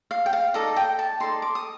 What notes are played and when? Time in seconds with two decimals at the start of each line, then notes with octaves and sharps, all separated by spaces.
0.11 F5
0.26 G5
0.33 F5
0.54 D#4 A4 D5 D#5
0.76 G5
0.99 A5
1.20 D#4 A4 D5 C6
1.42 D6
1.55 D#6